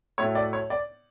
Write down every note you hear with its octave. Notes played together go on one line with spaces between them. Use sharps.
A2 F#3 A3 C#5
D5
C#5
D5